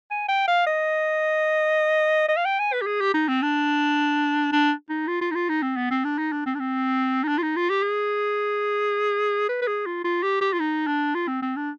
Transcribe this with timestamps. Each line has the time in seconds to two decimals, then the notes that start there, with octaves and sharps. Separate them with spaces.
0.11 G#5
0.29 G5
0.48 F5
0.66 D#5
2.28 D#5
2.37 F5
2.45 G5
2.59 G#5
2.73 B4
2.82 G4
2.87 G#4
3.01 G4
3.14 D#4
3.28 C4
3.42 D4
4.52 D4
4.89 D#4
5.07 F4
5.21 F4
5.31 D#4
5.35 F4
5.49 D#4
5.62 C4
5.76 B3
5.90 C4
6.05 D4
6.18 D#4
6.32 D4
6.46 C4
6.55 D4
6.60 C4
7.24 D#4
7.28 D4
7.38 F4
7.43 D#4
7.56 F4
7.70 G4
7.83 G#4
9.49 B4
9.62 B4
9.67 G#4
9.86 F4
10.04 F4
10.23 G4
10.41 G4
10.53 F4
10.60 D#4
10.87 D4
11.15 F4
11.28 C4
11.42 C4
11.56 D4